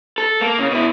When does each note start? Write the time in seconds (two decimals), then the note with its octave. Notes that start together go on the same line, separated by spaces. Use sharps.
0.18 A4
0.41 A#3
0.59 C#3
0.70 B2 E4